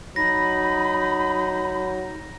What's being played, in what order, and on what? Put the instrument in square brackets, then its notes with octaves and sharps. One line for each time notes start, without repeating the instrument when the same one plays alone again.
[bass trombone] F#3 [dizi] D#4 [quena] B5 [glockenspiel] A#6